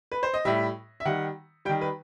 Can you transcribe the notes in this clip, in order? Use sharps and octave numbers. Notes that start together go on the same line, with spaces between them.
B4
C5
D#5
A2 G3 E5
E5
D#3 G3 F#5
D#3 G3 G5
B4